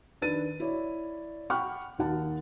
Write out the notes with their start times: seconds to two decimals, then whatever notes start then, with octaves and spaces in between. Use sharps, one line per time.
0.22 D#3 D4 B4 A6 D#7
0.60 E4 C#5 D5
1.50 F#5 G5 B5 C#6 F6 F#6
1.98 D#2 D#4 F#5 A5